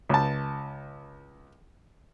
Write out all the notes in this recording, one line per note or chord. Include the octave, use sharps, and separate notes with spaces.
C#2 A5